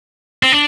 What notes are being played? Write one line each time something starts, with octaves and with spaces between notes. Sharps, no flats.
C4
D4